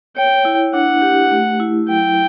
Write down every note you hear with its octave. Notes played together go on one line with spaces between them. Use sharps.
C#5 G5
E4
D4 F#5
G4
A3
E4
F#3 G5